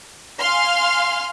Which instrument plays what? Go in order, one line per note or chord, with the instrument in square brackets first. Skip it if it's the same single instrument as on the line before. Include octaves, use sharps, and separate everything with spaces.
[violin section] F5 G#5 C6 F6